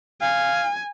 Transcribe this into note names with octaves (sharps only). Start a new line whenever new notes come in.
F5 G#5